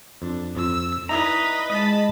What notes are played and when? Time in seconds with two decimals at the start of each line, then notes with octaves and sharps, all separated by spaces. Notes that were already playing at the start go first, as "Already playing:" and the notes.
0.22 F2 D4
0.56 F2 E6
1.09 D#4 E4 B4 D5 D#5 A#5
1.70 G#3 D#5 A5 B5